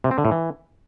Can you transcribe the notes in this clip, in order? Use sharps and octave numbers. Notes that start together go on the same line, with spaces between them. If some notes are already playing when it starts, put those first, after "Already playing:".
C3
C4
D3
A2
E3